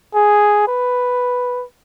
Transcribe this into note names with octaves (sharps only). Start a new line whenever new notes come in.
G#4
B4